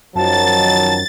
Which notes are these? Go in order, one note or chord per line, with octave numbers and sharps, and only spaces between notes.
F#2 D#3 F3 F#3 A5 A6